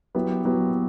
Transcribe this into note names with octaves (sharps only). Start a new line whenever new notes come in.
F#3 B3 E4 G4
F#3 B3 E4 G4